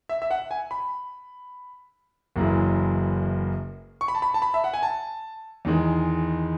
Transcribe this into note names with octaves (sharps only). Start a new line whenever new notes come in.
E5
E5
F#5
G#5
B5
F#1 F#2 E3 G#3
C#6
B5
A5
B5
A5
B5
E5
F#5
G#5
A5
E2 D#3 G#3